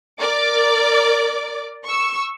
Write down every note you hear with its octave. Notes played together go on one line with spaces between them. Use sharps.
A#4 D5 D6
C#6 E6